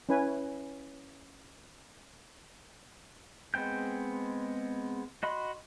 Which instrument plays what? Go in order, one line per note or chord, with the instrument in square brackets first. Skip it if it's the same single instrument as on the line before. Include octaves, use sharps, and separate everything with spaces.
[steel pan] C#4 E4 B4 G#5
[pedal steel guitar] G#3 B3 C4 G5 G6
F#4 D#5 B5 C6